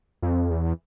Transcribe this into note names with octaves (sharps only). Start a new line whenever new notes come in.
F2
E2